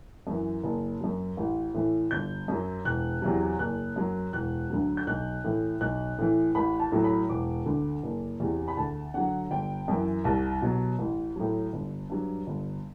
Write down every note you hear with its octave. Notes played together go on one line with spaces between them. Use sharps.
F#2 E3
F#1
F#2 F#3
A1
A2 E3
G1 G6
F#2 F#3
E1 F#6
E2 C3 F#3
F#1 F#6
F#2 F#3
E1 F#6
D2 D3 F#3
G6
B1 F#6
A2 E3
B1 F#6
A2 E3
A1 B5
A5
A2 F#3
B5
E1 D6
D2 D3
F#1
E2 C3
B5
D2 A5
D3 F#3 F#5
G1 G5
F#2 E3
C2 A5
B2 F#3
A1
A2 F#3
G1
G2 F#3
G1